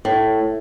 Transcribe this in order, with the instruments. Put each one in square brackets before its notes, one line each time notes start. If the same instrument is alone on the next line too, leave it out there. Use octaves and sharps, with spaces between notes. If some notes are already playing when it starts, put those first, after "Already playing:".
[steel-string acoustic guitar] A2